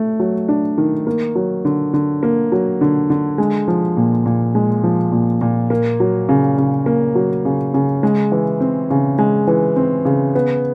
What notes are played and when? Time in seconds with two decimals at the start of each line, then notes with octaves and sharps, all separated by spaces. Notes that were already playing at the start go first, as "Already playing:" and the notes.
Already playing: A3
0.20 F#3
0.49 D4
0.78 D#3
1.07 A#3
1.35 F#3
1.65 D3
1.94 D3
2.23 A#3
2.52 F#3
2.81 D3
3.10 D3
3.38 G#3
3.68 F3
3.97 A#2
4.26 A#2
4.55 G#3
4.84 F3
5.12 A#2
5.41 A#2
5.70 A#3
6.00 F#3
6.29 C#3
6.58 C#3
6.86 A#3
7.15 F#3
7.45 C#3
7.74 C#3
8.03 G#3
8.32 E3
8.61 C4
8.90 C#3
9.19 G#3
9.47 E3
9.76 C4
10.05 C#3
10.35 B3